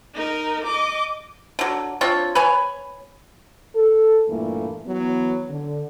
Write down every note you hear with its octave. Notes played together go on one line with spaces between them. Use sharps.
D#4 A#4
D#5 D6
D3 F#3
C4 D4 F4 C#5
B4 C#5 G#5
A4
G2 A#2 E3 A3 A#3
E3 F#3 B3
D3